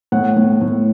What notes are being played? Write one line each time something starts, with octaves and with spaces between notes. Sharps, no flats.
A2 F#5
A2
A2